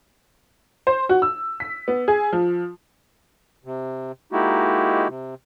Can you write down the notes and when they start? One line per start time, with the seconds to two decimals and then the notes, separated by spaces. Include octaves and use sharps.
0.87 C5
1.09 F#4
1.22 E6
1.60 B6
1.88 B3
2.08 G#4
2.33 F3
3.65 C3
4.33 G#3 A#3 D#4 E4 F#4 G4
5.08 C3